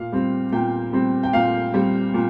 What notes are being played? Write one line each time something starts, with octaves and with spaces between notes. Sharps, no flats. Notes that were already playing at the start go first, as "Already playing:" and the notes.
Already playing: A#2 F5
G3 C4
A#2 G5
G3 C4
G5
A#2 F5
G3 C4
A#2